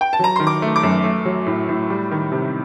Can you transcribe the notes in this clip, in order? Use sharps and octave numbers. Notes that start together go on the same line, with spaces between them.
G5
A5
F#3 A#5
D#3 C6
D6
A3
D6
F#2
A3
F#3
A2
A2
G3
D#3
C3